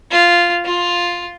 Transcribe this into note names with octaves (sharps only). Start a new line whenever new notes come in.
F4
F4